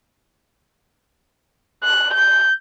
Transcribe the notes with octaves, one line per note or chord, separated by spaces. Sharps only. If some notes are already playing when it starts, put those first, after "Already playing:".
F#6
G6